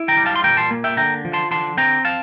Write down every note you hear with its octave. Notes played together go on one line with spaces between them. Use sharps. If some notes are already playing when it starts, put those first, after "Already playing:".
Already playing: E4
G5 A#5
G3
F5 A5
C6
A#2 G5 A#5
A5 C6
A#3
E5 G5
D3 G5 A#5
F3
A5 C6
D3 A5 C6
C4 G5 A#5
F5 A5